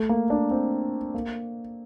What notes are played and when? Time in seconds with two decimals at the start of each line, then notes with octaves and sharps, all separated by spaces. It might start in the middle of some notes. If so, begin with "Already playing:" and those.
Already playing: A3
0.09 A#3
0.30 D4
0.51 C4
1.14 A#3